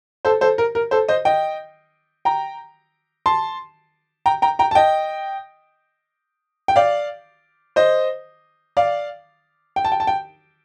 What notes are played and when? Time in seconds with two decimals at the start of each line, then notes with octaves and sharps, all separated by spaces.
0.25 A4 C5
0.41 A4 C5
0.58 A#4
0.75 A#4
0.91 A4 C5
1.08 C5 D#5
1.25 D#5 G5
2.25 G5 A#5
3.26 A5 C6
4.26 G5 A#5
4.42 G5 A#5
4.59 G5 A#5
4.71 A5
4.75 D#5 G5
6.68 G5
6.76 D5 F5
7.76 C5 D#5
8.77 D5 F5
9.76 G5
9.85 A5
9.92 G5
10.00 A5
10.07 G5